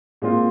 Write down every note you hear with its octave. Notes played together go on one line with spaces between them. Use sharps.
A#2 G#3 C4 F4